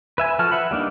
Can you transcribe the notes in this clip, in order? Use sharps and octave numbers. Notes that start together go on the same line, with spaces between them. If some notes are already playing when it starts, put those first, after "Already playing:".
B4 E5 G#5
F3 F#4 A4 A5 F6
B4 E5 F#5 B5
G3 A#3 D4 D#4